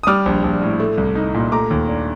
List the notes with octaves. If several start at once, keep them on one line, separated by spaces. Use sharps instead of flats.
D#6
G3 D6 F6
A#1
A#1
A2
A3
C2
D#4
A#2
A3 A#5 D6
D#2
D4